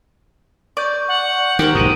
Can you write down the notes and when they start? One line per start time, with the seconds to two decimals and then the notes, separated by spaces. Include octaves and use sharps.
0.77 D5 C#6 G6
1.08 F#5
1.59 D#3 G4 A#4 C5
1.75 B1 G#2 D#6 D7 D#7